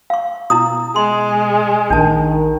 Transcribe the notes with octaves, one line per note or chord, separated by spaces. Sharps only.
F5 C#6
B2 E4 A#5 D#6
G#3 C6
A#1 D#3 D4 A5